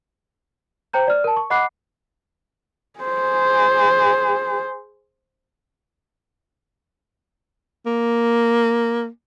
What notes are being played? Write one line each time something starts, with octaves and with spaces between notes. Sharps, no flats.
C5 G5 A#5 G6
D5 F6
A#4 A5
C#6
D#5 F#5 B5 D6 F#6 C7
G#4 C5
A#3